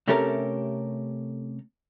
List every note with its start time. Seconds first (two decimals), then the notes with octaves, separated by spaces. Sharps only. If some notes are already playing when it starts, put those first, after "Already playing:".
0.08 C3 A3 C#4 G4 A4 A#4